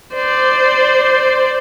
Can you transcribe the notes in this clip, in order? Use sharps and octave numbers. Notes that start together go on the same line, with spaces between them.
C5 D5